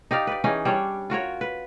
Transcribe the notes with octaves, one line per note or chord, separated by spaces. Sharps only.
D#4 G4 D5 F5
B4 D5
E3 C#4 D#4 G#4
G3 C#4 D4 C#5
F4 F#4 A#4 C#5
B4